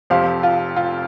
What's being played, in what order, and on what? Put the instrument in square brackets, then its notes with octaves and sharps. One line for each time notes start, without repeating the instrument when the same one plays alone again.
[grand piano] F1 F2 F3 C4 G4 [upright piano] F5
[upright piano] F4
F4